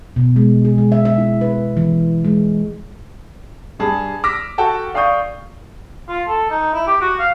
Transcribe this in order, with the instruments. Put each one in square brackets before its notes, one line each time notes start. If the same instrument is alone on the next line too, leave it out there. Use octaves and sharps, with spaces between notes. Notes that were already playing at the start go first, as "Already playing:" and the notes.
[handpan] B2
G#3
G#4
G#3
E5
E5
E4
B4
E3
G#3
[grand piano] G2 G3 G#4 A5
D6 E6 F6 A#6 B6
F#4 A4 F#5 G5 A5
D5 F5 G5 C#6 D#6 G6
[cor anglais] F4
A4
D#4
E4
G4
F#4
F5